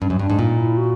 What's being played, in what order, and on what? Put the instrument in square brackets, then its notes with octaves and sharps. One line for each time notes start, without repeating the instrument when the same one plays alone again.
[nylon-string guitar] G2 [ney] C#4
[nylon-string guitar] F#2
[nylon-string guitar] G2 [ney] D4
[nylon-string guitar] G#2
[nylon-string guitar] A#2 [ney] D#4
[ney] E4
F#4